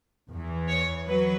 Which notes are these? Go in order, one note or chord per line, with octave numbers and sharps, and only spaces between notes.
E2 E3
C#5
F#3 B4